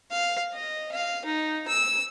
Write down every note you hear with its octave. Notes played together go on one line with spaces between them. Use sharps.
F5
D#5
F5
D#4
E6